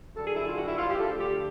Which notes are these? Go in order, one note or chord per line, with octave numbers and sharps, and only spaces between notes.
F#2 D3 G3 A4
G#4
E4
F4
F#4
E4
F4
G4
D2 D3 F3 A4
G4